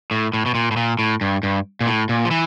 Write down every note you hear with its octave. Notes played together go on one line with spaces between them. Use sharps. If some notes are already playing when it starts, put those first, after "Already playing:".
A2
A2
B2
A#2
A2
A#2
A2
G2
G2
A#2
A2
A#2
F3
E3